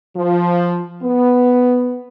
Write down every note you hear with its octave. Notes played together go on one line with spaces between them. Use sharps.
F3
B3